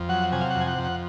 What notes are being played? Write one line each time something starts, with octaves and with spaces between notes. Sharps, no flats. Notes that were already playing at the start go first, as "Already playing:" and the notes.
Already playing: F2
F#3 F#5
C3 G#5
F5
F#5
F2
G#5
F#5
F2
F#5